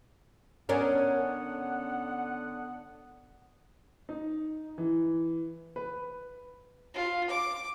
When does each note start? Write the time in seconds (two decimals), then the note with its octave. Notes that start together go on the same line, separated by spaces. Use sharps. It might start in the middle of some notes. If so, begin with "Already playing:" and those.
0.69 D3 B3 C#4 D4 A#4 F#5
4.09 D#4
4.78 E3
5.76 B4
6.94 F4
7.30 D6